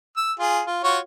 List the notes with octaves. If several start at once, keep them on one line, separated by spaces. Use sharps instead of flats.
E6
F4 G#4
F4
F4 F#4 C#5